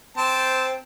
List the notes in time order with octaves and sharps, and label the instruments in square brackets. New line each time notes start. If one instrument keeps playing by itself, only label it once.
[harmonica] C4 C5 A5